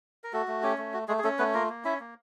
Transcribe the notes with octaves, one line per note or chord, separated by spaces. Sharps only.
A#4
A3 F#4 A4
A3
C#4 G4
A3
F#4
G#3 A3 G#4
G#4
A3 C#4 A4
A3 B3 B4
A#3 F4 A#4
A#3
C#4 E4 E5
A#3